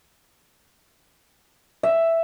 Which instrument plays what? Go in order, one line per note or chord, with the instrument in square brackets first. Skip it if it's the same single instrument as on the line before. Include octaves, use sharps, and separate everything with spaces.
[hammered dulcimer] E5